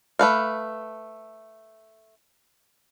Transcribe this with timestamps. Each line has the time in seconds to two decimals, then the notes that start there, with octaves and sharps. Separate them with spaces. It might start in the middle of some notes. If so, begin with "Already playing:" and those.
0.19 A3 B4 F5